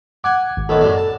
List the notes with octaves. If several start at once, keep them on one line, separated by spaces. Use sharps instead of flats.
F#5 G#5 D6
G#1
A2 D#3 B3 A4
F#2 A2 D4
A5